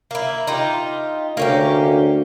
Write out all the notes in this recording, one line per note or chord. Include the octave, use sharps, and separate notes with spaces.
A#3 E4
D#4 F4 G4
D2 A#3 C#4 G4